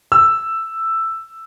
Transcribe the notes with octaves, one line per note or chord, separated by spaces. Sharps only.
E6